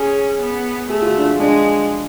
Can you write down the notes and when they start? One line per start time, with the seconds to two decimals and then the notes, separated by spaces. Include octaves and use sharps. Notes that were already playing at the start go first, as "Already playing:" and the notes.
Already playing: C#4 G#4
0.41 B3
0.90 A3 G#4
1.02 F4
1.06 F#4
1.17 D4
1.22 F4
1.39 G#3 D4